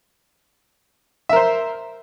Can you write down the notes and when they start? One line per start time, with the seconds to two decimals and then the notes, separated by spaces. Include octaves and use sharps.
1.29 E5
1.33 A#4
1.36 C5